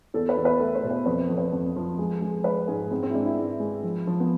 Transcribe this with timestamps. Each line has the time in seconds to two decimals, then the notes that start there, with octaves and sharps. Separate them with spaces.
0.14 E2 A4
0.29 B4
0.37 E2
0.45 B4
0.59 A3
0.75 C5
0.83 B2
0.90 C5
1.06 F2 B4
1.30 F2
1.38 B4
1.53 F2
1.76 F3
1.99 G#3
2.22 G#3
2.44 G#3 B4
2.68 G#2 G#4
2.91 G#2 C4
3.03 C4
3.10 E4
3.14 G#3 D4
3.26 E4
3.38 G#2
3.60 G#3
3.83 F3
4.07 F3
4.20 B3